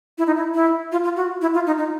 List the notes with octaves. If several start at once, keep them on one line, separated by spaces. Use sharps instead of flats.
E4
D#4
E4
E4
F4
F4
F#4
E4
F4
D#4
D#4